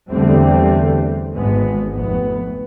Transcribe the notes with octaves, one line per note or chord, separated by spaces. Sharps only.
E2 D3 G3 A3 C4
G#1 G#3 B3
F1 B3